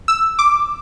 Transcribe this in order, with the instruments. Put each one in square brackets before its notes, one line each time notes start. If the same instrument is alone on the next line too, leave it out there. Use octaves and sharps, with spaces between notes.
[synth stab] E6
D6